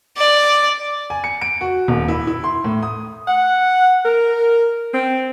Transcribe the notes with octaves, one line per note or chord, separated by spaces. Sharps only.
D5
G#5
C#7
D7
F#4
D#1
E4
E4
C6
A2
D#6
F#5
A#4
C4